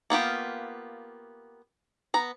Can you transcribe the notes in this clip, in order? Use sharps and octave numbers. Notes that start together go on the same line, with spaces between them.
A#3 B3 F4 G4
B3 A#5